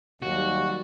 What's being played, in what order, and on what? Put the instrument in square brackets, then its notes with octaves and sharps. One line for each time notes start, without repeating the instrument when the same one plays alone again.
[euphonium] D#2 [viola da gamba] F#3 G3 [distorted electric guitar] F#4